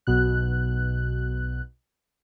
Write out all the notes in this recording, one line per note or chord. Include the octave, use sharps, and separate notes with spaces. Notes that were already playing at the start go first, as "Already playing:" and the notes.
B1 B2 F#6